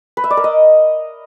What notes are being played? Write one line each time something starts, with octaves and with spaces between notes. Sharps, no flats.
B4
E5
D5
A#4
D#5